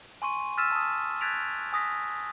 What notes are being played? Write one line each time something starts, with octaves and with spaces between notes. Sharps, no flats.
G#5 C6 C#6 D#7
E6 F6 A6 B6 D#7 E7
A5 D#6
F#6 G#6 A6 B6 D7 F7
G#5 D#6 A#6 B6